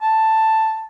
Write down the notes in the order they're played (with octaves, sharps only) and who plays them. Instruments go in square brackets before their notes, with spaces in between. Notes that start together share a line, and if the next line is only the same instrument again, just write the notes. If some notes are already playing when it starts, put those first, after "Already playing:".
[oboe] A5